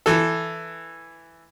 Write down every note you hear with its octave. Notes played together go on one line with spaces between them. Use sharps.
E3 A4